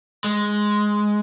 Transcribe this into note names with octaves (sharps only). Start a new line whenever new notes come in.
G#3